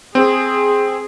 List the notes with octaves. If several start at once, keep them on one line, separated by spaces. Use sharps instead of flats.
C4 G#4